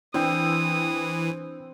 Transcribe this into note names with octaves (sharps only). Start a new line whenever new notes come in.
E3 C4 D4 G5 D#6